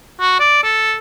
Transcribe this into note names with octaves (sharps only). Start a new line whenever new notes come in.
F#4
D5
A4